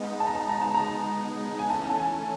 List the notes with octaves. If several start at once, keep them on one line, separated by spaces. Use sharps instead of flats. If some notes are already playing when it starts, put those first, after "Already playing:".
Already playing: G#3 B3 D#4
A5
A#5
A5
A#5
A5
A#5
G#5
E3 A3 C#4 A5
A5
G#5